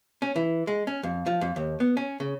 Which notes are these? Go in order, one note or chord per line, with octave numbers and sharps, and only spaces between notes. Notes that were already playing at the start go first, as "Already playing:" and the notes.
C#4
E3
G#3
C#4
F2
F3
F2
D#2
B3
C#4
C#3